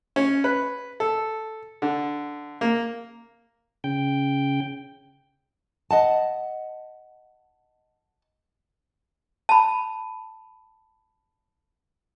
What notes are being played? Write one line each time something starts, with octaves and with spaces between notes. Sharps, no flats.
C#4
B4
A4
D3
A#3
C#3 G5
D#5 F#5 A5
A5 B5